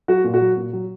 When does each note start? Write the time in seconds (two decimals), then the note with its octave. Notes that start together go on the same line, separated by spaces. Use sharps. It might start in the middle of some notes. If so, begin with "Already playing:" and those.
0.08 F#3 F#4
0.24 A#2
0.34 F#4
0.41 F#3
0.57 A#2
0.73 F#3